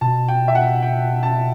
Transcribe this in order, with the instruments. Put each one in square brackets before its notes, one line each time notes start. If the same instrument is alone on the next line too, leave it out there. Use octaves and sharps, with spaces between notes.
[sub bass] B2 [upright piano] A5
[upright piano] G5
E5
F#5
G5
A5